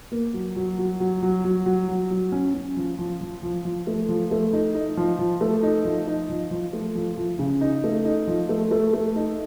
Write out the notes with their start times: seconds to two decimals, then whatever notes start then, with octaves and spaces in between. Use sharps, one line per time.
0.12 A#3
0.34 F#3
0.56 F#3
0.79 F#3
1.00 F#3
1.23 F#3
1.44 F#3
1.66 F#3
1.88 F#3
2.11 F#3
2.32 C#4
2.54 C#4
2.77 F3
2.99 F3
3.21 F3
3.43 F3
3.65 F3
3.87 A3
4.09 F3
4.31 A3
4.53 D#4
4.75 D#4
4.97 F3
5.19 F3
5.41 A3
5.63 D#4
5.85 F3
6.07 D#4
6.29 F3
6.51 F3
6.73 A3
6.95 F3
7.17 F3
7.39 C#3
7.61 D#4
7.84 A3
8.05 D#4
8.27 F3
8.49 A3
8.71 A3
8.93 A3
9.16 D#4